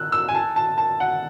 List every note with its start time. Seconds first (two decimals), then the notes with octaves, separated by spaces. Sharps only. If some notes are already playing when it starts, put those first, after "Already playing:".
Already playing: E6 F#6
0.12 E6
0.29 G#5
0.35 A5
0.56 A5
0.78 A5
1.00 F#5